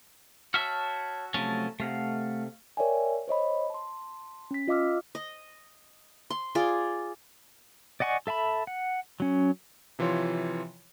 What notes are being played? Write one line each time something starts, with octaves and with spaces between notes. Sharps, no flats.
F#4 C#5 E5 A5 F6
C3 F3 F#3 A3 C#4 A5
C3 A3 F5 F#5
A#4 C#5 D5 E5 G5 G#5
C5 C#5 D#5 B5
A5 C6
C#4 B6
F4 D#5 F5 D6 E6 F6
D#5
C6
F4 G#4 D5
D5 D#5 F#5 G#5 C#6
A4 E5 A5 B5
F#5
F#3 C#4
C3 E3 F3 F4 C#5 C6